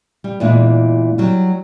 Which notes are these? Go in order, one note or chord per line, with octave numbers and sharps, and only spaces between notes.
G3
E2 A#2 G#3 D4
F#3 G3